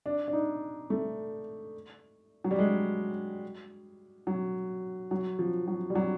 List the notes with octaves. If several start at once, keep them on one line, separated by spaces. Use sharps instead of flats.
D4
D4
D#4
A3
F#3
G3
G#3
F#3
F#3
F3
F#3
G3
F#3